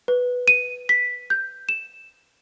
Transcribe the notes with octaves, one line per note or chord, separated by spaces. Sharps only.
B4
D#7
B6
G6
E7